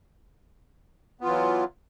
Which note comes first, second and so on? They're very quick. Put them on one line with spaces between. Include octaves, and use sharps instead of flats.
B3 F4 E3 F#3